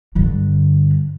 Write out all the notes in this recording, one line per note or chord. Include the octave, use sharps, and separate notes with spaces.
G2 D3